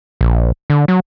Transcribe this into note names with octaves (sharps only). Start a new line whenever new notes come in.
A#1
D3
F#3